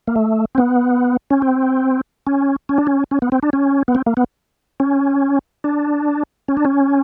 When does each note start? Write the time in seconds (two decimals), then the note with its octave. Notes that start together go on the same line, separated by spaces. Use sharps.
0.08 A#3
0.16 A3
0.55 C4
0.58 B3
1.31 C#4
1.42 C4
2.27 C#4
2.69 C#4
2.78 D4
2.87 C#4
3.11 C#4
3.22 B3
3.32 C4
3.43 D4
3.53 C#4
3.88 B3
3.95 C4
4.06 A#3
4.17 B3
4.80 C#4
5.64 D4
6.48 C#4
6.57 D4
6.65 C#4